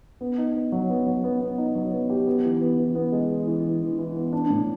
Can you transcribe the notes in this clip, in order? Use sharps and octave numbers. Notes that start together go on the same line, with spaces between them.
B3
D#4
B3
F#3
B3
F#3
B3
B3
D#4
F#3
B3
G4
B3
E3
B3
E3
B3
G#3
E3
E3
E3
E3
E3
B3
D4
A2